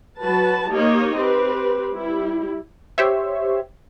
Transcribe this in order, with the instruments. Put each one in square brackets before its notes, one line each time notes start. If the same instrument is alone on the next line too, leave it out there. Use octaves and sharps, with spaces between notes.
[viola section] F#3 F#4 B4 A5
A#3 D#4 G4 C#5 D#5
C4 G4 B4
G3 E4
[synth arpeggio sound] G4 C5 C#5 E5